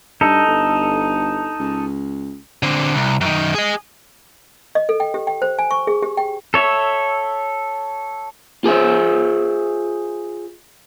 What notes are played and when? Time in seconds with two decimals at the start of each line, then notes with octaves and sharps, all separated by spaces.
0.21 G2 D#4 A4
0.47 G1
1.60 C#2
2.63 D3 C4
2.95 C2
3.21 F#2 D#3
3.55 G#4 D#5
4.75 D#5
4.89 A4
5.00 G5
5.14 G4
5.27 G5
5.42 C5
5.59 G#5
5.71 C#6
5.87 G#4
6.02 G4
6.17 G5
6.54 A4 C#5 E5
8.64 F4 G#4 C5 E5